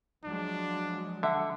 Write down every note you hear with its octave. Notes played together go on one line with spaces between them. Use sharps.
F3 F#3 G#3 D4
D3 E5 F#5